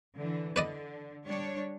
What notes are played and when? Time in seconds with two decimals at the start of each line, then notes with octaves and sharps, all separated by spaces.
0.17 D3 E3
0.56 D3 B4 D5 D#5
1.26 G3 D4 C#5